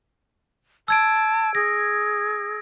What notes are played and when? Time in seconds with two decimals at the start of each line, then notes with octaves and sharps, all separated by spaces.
0.88 A5 E6 G#6 D7
1.55 G#4 A#6